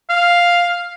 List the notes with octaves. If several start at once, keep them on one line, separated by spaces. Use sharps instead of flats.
F5